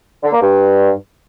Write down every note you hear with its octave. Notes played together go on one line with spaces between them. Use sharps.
D3
A#3
G2